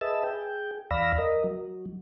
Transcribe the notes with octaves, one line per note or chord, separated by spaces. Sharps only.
G#4 B4 D#5 E5 A5 E6
G#4 G5
E2 D5 F5 B5 E6 A#6
A#4 D#5
F#3